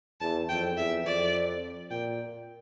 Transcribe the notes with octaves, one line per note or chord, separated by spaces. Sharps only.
E2 A5
F2 G5
E2 E5
F2 D5
A#2 G5